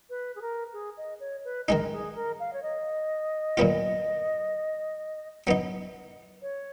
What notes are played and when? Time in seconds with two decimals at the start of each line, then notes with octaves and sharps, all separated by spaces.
0.10 B4
0.36 G#4
0.42 A#4
0.73 G#4
0.97 D#5
1.20 C#5
1.45 B4
1.68 D#3 G#3 D#4 A#4
1.92 G#4
2.15 A#4
2.40 F5
2.53 C#5
2.63 D#5
3.57 A#2 F#3 B3 F4
5.47 F#3 B3 D#4
6.42 C#5